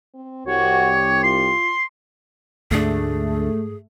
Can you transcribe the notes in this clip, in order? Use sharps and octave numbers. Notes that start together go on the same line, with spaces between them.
C4
C2 F#4 G4 C#5
F4 C6
D2 G#2 A3 D4 G#4